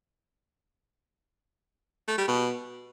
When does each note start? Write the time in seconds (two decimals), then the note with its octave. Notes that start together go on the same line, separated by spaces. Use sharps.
2.08 A3
2.18 G3
2.28 B2